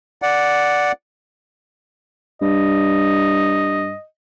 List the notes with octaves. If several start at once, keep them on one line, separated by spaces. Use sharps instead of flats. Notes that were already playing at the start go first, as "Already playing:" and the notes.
D5 F#5
G2 D#5